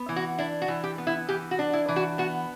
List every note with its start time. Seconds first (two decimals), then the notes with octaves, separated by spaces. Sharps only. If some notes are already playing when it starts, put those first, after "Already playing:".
Already playing: B3
0.09 E3
0.16 F#4
0.39 D4 E4
0.62 F#4
0.68 E3
0.84 G4
0.98 B3
1.07 E4
1.29 E3 G4
1.51 F#4
1.59 D4
1.73 E4
1.89 E3
1.96 F#4
2.18 B3 F#4